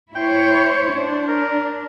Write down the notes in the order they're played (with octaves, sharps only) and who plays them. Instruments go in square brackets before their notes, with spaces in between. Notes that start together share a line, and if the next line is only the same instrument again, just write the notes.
[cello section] E4 C5 C#5 [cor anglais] G5
[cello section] D4 [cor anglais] C5
[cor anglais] A#4